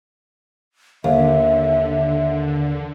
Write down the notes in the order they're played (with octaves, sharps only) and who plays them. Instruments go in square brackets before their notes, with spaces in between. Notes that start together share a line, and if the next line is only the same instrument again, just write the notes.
[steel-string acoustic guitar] D#2 [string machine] D3 [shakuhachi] E5